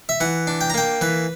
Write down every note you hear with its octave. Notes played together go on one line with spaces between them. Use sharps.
E5
E3 F#5
D4
G5
A#5
A#3 G5
E3 B4